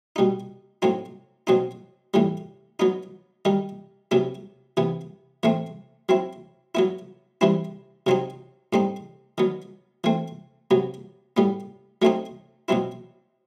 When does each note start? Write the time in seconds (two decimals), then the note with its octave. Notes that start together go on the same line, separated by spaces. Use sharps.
0.16 B2 G3 D#4
0.82 A2 F#3 C4 D#4
1.47 B2 F#3 C4 D#4
2.14 A2 E3 G3
2.80 F#3 B3 D#4
3.45 D#3 G3 D#4
4.11 C3 F#3 B3 E4
4.77 C3 E3 B3
5.43 A2 E3 A3 C4
6.09 F#3 C4 E4
6.75 F#3 B3 E4
7.41 E3 G3 C4 E4
8.07 C3 F#3 C4 D#4
8.73 A2 G3 C4 D#4
9.38 D#3 F#3 B3
10.04 E3 A3 C4
10.71 C3 F#3 B3
11.37 A2 G3 B3
12.02 F#3 A3 C4 D#4
12.68 B2 F#3 C4 E4